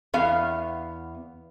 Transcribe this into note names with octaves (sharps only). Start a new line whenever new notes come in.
E2 B3 F5